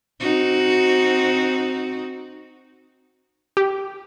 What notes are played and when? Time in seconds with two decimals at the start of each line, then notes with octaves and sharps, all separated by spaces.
0.20 C4 D#4 F#4
3.57 G4